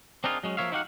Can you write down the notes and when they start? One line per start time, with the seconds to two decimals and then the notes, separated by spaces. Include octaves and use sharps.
0.24 C4 D4 D#4 F4 G#4 A#4
0.44 F#3 G#3 C#4
0.57 F3 A#3 C#5 E5 F5
0.72 D#4 E4 F#4 G4 F5 F#5